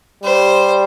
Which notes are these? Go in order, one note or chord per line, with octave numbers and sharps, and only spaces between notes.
G3 C5